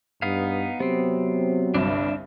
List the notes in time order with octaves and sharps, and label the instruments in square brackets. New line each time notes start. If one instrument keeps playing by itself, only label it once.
[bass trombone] G2 [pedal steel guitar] B3 D#4 F5
[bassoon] C3 [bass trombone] F#3 [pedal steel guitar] B3 C4
[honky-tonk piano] G1 C2 G2 [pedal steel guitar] D4 A5